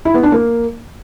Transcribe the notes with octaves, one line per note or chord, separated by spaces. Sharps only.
E4
B3
D4
A#3